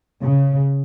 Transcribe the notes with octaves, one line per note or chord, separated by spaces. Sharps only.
C#3